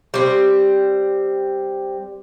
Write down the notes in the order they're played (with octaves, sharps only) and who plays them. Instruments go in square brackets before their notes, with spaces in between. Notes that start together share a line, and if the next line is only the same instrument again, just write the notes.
[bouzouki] G3 C4